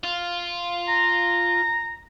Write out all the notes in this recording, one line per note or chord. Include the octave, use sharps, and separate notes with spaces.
F4
A#5